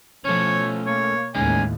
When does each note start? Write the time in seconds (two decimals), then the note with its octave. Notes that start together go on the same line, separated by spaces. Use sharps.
0.25 B2 F3 A3 C#4 C#5
0.87 A#3 C#5
1.35 A1 D#2 A2 G#3 C#4 D#4 G#5